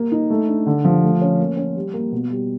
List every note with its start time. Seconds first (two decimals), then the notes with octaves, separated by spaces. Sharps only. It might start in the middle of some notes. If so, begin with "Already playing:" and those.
Already playing: A#3
0.12 D#4
0.30 A3
0.48 D4
0.67 D3
0.85 F3
1.03 A3
1.21 C#4
1.39 A#3
1.57 C#4
1.76 G3
1.93 A#3
2.12 B2
2.30 G3